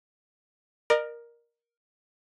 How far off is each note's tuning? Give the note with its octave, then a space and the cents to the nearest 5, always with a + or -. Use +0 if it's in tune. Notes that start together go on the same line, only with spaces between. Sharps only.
A#4 +10 D#5 -45